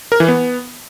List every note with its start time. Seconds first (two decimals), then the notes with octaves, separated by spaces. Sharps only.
0.12 A#4
0.20 E3
0.28 B3